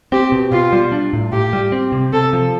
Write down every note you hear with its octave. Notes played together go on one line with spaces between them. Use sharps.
C4 G4
B2
B2 F4
G3
D4
A2
A2 G4
G3
C4
C3
C3 A4
F3